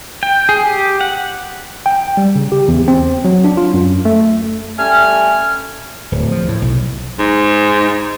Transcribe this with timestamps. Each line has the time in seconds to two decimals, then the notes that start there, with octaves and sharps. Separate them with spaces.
0.23 G5
0.49 G#4
0.66 G4
1.01 F#5
1.86 G5
2.17 G3
2.35 C#3
2.52 G4
2.68 E2
2.88 C4
3.25 F#3
3.44 D4
3.57 F4
3.74 F#2
4.05 A3
4.78 G3 A3 C#4 G#5 F6
6.12 D1
6.32 F3
6.48 A2
6.62 B1
7.19 G#2